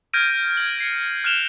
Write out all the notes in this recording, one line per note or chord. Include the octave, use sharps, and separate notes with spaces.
F6 G6 G#6 A#6 D7 D#7
G#6 F#7
G#6 C7 C#7
F6 F#6 G#6 E7 F7 G7